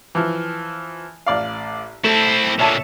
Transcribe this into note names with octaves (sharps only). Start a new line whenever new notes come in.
E3 F3
A1 D5 F5
A3 C4 E4 A4
A#2 D3 C#5 E5 A5